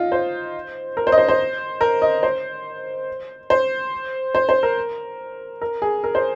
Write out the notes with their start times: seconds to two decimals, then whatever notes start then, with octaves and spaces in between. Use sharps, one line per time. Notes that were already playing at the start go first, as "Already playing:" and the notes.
Already playing: D#4 F4
0.12 C5
0.97 A#4
1.07 C5
1.12 D#5
1.18 C5
1.29 C5
1.81 A#4
2.02 D#5
2.23 C5
3.50 C5
4.35 C5
4.49 C5
4.63 A#4
5.62 A#4
5.82 G#4
6.04 A#4
6.15 C5